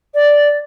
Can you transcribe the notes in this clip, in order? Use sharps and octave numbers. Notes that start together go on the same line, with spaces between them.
D5